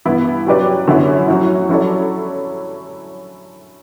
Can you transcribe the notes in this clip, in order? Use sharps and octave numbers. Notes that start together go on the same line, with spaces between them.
G2 E3 B3 E4
F#3 C#4 G4 B4 D5
F#2 D3 F#3 C#4 E4
A2 F#3 C#4 F#4
F#3 C#4 E4 A4 D5